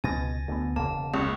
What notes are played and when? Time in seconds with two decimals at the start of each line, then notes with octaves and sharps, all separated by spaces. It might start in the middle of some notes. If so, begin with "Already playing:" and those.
0.04 C#2 B2 G#5 A6 A#6
0.48 D2 D3 B3
0.76 E1 C#3 A#3 A5
1.14 C#2 C#6